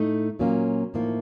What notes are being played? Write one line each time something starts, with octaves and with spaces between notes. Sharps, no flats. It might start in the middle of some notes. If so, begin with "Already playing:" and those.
Already playing: A2 A3 D#4
A#2 F#3 A#3 C#4 F4
A2 F3 A#3 D#4